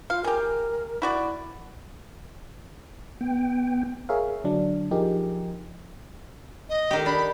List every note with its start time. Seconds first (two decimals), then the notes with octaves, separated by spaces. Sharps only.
0.10 F4 F5
0.24 G4 G#4 A#4
1.02 E4 F#4 D5
3.21 B3 G5
4.09 G#4 A#4 C#5 E5 F5
4.44 D3 F#3 D4
4.91 F3 D#4 G4 G#4 A#4
6.69 D#5
6.91 D#3 G4
7.06 D4 B5